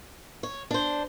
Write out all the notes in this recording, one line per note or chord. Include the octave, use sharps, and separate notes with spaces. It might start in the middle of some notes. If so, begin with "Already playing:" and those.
C#5
D4 C5